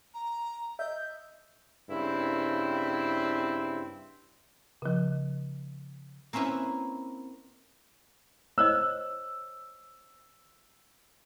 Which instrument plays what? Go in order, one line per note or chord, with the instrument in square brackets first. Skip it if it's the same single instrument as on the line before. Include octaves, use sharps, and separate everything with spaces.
[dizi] A#5
[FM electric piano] D#5 E5 [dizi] G6
[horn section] G2 C#3 C4 E4
[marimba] C#3 F3
[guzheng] A#3 C4 C#4 E4 B4
[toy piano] C5 C#5 D#5 [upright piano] E6